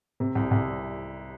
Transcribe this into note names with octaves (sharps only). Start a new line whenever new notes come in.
C3
C2
C2